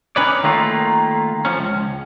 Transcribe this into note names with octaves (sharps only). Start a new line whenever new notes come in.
C#4 D#4 B4 C#5 D5
D#3 A3 A#3 F4
F3 C#4
C#2